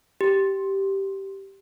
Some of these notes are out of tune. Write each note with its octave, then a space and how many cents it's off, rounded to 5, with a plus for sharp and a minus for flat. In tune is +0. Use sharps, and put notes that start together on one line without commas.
G4 -10